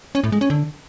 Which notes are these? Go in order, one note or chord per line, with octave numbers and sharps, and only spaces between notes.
C#4
A2
G#3
C#4
D3